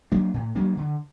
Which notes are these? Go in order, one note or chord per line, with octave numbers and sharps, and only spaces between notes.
F#3 A#3 D4
A2
F#3 A#3 D4
D3